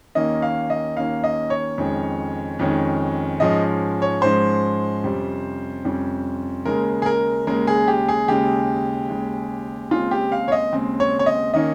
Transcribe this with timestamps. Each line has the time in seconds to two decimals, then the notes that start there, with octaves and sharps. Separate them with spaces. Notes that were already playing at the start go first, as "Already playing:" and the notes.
0.15 D#2 D#3 A#3 C#4 D#5
0.42 F5
0.70 D#5
0.96 D#2 D#3 A#3 C#4 F5
1.24 D#5
1.50 C#5
1.78 F2 D#3 G#3 C#4
2.59 F2 D#3 G#3 C#4
3.40 G#2 F3 G#3 C#4 D#5
4.02 C#5
4.22 G#2 F3 G#3 C#4 C5
5.04 F2 C3 G3 C#4
5.84 F2 C3 G3 C#4
6.65 D#2 C#3 G#3 A#4
7.02 G#4
7.06 A#4
7.47 D#2 C#3 G#3 A#4
7.67 G#4
7.88 G4
8.08 G#4
8.28 D#2 C#3 G#3 G4
9.10 D#2 C#3 G#3
9.91 D#2 C#3 G#3 C4 F4
10.11 G4
10.32 F5
10.48 C#5
10.52 D#5
10.72 D#2 C#3 G#3 C4
11.00 C#5
11.19 C#5
11.26 D#5
11.54 D#3 A#3 C#4 D#5